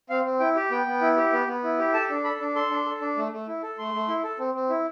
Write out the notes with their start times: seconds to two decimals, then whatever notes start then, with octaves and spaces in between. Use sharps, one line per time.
0.10 C4 F5
0.25 C4
0.40 E4 G5
0.56 G4
0.71 B3 G5
0.87 B3
1.02 E4
1.17 G4
1.33 B3
1.48 B3
1.64 E4
1.79 G4
1.94 A4 A5
2.09 D4
2.24 A4 B5
2.40 D4
2.56 A4 C6
2.71 D4
2.86 A4
3.01 D4
3.17 A3
3.32 A3
3.47 E4
3.63 A4
3.78 A3 C6
3.94 A3
4.08 E4
4.24 A4
4.39 C4
4.54 C4
4.69 E4